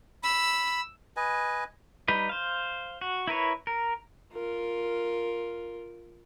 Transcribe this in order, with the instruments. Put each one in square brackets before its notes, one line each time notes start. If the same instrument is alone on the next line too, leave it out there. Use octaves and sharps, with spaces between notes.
[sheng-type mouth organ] B5 [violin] E6
[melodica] B4 D#5 G#5
[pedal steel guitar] G3 D#4 B4
C5 F5
F#4
E4 A#4 B4 C#5
A#4
[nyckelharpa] F4 A#4